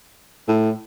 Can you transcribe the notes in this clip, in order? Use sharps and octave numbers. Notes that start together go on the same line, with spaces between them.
A2